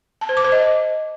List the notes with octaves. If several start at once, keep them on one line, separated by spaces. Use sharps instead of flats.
A5
C5
D6
C5
D#5